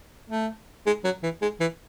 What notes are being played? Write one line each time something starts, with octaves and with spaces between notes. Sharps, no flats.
A3
G#3
F#3
E3
G#3
E3